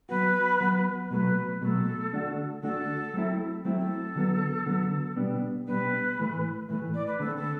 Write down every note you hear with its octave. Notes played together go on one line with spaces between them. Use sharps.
F#3 B3 F#4 B4
F#3 B3 F#4
B2 F#3 A3 B4
B2 F#3 A3 A4
D3 A3 D4 F#4
D3 A3 D4 F#4 A4
F#3 A3 C4 E4
F#3 A3 C4 E4 A4
A4
D3 F#3 B3
D3 F#3 B3
B2 G3 B3 D4
B2 G3 B3 D4 B4
A2 E3 A3
A2 E3 A3 B4
D5
B4
D3 A3 C4 A4
A4